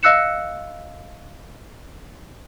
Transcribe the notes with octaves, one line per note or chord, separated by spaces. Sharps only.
D#5 F5 E6 F#6 C#7 E7